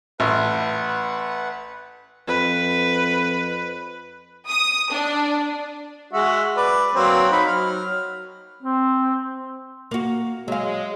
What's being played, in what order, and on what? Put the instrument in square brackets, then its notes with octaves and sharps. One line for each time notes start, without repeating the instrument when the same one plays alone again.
[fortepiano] A1 [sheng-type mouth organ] B4 F#5
[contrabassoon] F2 [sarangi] B4
[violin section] D#6
D4
[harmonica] G#3 F#4 E5
B4 D5
F#3 A#3 C4
D#4 B5
F#3 F6
[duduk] C4
[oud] A#3 F#4
[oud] F#3 F5 [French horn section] G#3